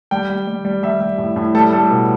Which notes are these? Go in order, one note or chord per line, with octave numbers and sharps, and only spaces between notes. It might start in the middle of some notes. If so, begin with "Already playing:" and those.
G3 G5
G3
G3
G3
G3 E5
G3
A2
A2
G3 A4
G3 A4
B2